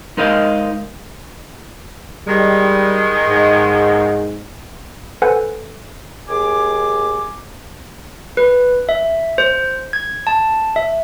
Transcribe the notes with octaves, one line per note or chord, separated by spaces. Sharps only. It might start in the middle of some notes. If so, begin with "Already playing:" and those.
G#3 D#4 A#4 C5 D#5 F5
D#3 G3 G#3
G#2
A4 B4 C5 F#5 G#5
D#2 G#4 G#5 D6
B4
E5
C5
G#6
A5
E5